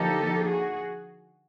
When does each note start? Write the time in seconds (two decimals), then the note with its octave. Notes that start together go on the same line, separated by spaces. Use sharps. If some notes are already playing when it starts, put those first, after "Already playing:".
Already playing: D3 F3 A#3 D#4 G4 A4
0.48 F#4 G#4